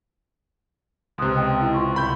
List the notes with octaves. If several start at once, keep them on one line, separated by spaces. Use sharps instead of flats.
C#2 C3 C6 D#6 F#6
D#5 G5
E4
F4 C6 C#6
C2 B5 G6